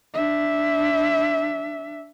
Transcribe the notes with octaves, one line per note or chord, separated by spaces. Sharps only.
D4 E5